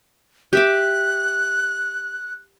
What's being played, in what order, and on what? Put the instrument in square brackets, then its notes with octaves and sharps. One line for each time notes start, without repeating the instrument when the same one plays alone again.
[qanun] G4 E5 D6 [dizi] F#6